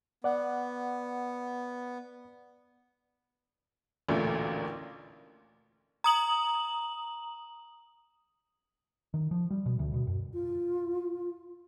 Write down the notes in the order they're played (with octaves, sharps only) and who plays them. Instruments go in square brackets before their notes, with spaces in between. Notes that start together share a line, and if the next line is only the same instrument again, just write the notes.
[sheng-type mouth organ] B3 [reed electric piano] D5 F#5
[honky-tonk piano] A1 D2 A#2 E3 A3
[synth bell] A#5 D#6 F#7
[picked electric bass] D#3
F3
G3
B2
D2
B2
F#2
[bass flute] F4